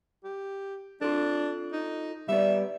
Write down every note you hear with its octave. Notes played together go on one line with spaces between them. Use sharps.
G4
D4 F4 A4
D#4
G3 B3 D5 E5